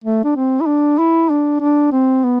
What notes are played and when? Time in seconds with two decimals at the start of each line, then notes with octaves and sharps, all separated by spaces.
0.04 A3
0.24 D4
0.36 C4
0.60 E4
0.66 D4
0.98 E4
1.30 D4
1.61 D4
1.92 C4
2.24 B3